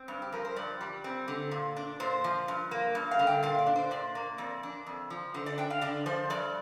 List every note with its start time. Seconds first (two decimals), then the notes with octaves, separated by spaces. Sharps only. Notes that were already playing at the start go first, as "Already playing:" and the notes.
Already playing: C4
0.08 G2
0.22 G4
0.32 F3 A#4
0.45 C5
0.56 G2 D5
0.81 G3
1.04 C4
1.28 D3
1.51 A#2
1.76 D4
2.00 A#2 C5
2.24 F3
2.48 G2
2.71 A#3
2.95 G2
3.11 F5
3.19 D3
3.27 G5
3.43 A#2 F5
3.59 D5
3.66 D4
3.76 C5
3.91 A#2 D5
4.15 A#3
4.38 F2 D5
4.63 D4
4.86 F2
5.10 F3
5.34 D3 C5
5.46 D5
5.58 D4 G5
5.70 F5
5.81 D3 D5
6.06 F3 C5
6.30 G2 D5